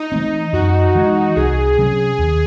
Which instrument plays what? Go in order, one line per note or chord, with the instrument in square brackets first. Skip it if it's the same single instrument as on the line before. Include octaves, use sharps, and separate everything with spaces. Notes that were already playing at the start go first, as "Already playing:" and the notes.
Already playing: [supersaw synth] D#4
[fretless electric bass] E3 A3 C4
[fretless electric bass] F#2 [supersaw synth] F#4
[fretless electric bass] E3 G#3
[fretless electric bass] C2 [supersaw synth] G#4
[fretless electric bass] C3 F#3 C#4
D#2